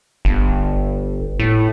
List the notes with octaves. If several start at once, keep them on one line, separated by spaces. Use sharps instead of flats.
G1
A2